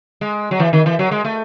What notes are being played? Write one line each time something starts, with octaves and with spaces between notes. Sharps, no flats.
G#3
F#3
E3
D#3
E3
F#3
G#3
A3